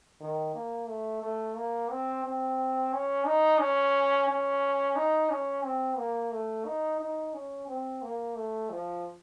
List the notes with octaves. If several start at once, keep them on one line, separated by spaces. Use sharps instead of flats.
D#3
A#3
A3
A3
A#3
C4
C4
C#4
D#4
C#4
C#4
D#4
C#4
C4
A#3
A3
D#4
D#4
C#4
C4
A#3
A3
F3